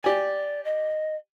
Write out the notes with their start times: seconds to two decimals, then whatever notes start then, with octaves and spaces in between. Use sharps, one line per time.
0.04 G4 D5 G#5
0.65 D#5